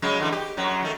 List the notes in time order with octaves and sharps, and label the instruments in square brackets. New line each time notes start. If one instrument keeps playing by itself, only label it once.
[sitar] C#3 F#3 G#3
D3 E3
G4
F#2 F#3
D#3 A3